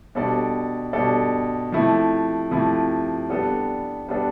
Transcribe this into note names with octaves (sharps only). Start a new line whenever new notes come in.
B2 G3 D4 A4 D5
B2 G3 D4 A4 D5
C3 F3 A3 E4
C3 F3 A3 E4
G3 B3 D4 A4
G3 B3 D4 A4